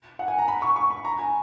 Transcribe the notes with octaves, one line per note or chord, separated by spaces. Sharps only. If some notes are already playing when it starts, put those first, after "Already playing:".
F#5
G#5
A#5
B5
C#6
C#6
B5
A#5
G#5